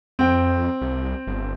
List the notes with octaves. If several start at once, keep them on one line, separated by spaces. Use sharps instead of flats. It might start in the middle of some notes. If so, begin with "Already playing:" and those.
F2 C4 G5
C2
G1